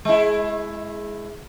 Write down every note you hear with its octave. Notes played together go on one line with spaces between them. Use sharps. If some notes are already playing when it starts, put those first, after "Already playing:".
G#3 E4